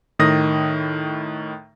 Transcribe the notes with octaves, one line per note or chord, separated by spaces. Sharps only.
A2 D#3 D#6 A#6